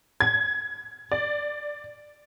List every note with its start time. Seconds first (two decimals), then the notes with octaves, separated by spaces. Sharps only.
0.20 G#6
1.12 D5